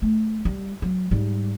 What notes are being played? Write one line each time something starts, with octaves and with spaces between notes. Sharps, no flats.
A3
G3
F#3
G#2 G3